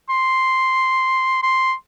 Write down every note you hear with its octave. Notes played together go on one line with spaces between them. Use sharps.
C6
C6